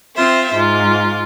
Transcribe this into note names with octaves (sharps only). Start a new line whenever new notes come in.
C4 F4 C5 E5
G#2 F4